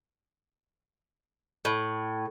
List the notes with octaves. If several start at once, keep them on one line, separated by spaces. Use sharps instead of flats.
A2